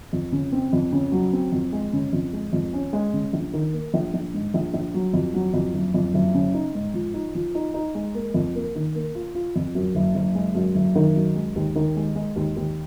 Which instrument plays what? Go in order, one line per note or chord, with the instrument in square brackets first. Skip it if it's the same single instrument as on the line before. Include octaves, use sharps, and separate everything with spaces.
[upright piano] F2
C#3
C4
F2
C#3
F#3
C4
F2
G#3
C#3
F2
G#3
F2
C#4
G#3
C#3
A#1
D#3
A#3
A#1
A#1
G#2
A#1
A#1
F#3
F2
F#3
F2
F#1
F2
F#1
C#3
D#4
G#2
F3
D#4
F3
D#4
D#4
G#3
A#3
F2
A#3
D#3
A#3
F4
F4
F2
F#2
F#1
F#1
G#3
F#2
F#1
D#3
F#2
G#3
D#2
D#3
G#3
G#3
D#2
D#2